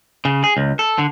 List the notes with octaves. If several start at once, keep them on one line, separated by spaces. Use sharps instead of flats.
C#3
G#4
C#2
A4
D3